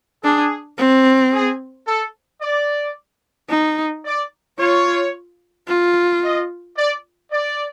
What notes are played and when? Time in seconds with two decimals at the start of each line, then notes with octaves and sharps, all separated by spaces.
0.23 D4 G#4
0.78 C4
1.32 G#4
1.86 A4
2.41 D5
3.50 D#4
4.05 D5
4.59 F4 C#5
5.68 F4
6.23 D#5
6.77 D5
7.32 D5